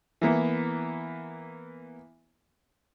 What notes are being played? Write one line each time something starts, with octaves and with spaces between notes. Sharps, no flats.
E3 A#3 B3